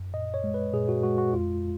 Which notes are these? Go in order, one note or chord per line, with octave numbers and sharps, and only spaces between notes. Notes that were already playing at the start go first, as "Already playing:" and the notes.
Already playing: F#2
A#2 D#5
C#5
G#3
B4
A#2 G#4
F#4
G#3 F#4
F#4
F2 F4